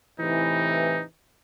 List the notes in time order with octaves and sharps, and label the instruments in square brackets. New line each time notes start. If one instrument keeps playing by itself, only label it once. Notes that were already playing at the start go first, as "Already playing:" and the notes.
[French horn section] A2 C3 E3 [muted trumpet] D#4